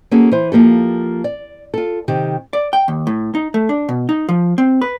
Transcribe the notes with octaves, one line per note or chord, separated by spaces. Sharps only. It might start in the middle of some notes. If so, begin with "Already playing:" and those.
A#3 C#4 F#4 G#4 A4
E3 C5
F3 A#3 G4 A4
D5
F4 A4
C3 D#3 G4
D5
G5
D#2
A2
D#4
A3
D4
B2
D#4
F3
C4
B4